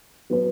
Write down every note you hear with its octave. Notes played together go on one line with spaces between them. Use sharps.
F#3 B3 F#4 B4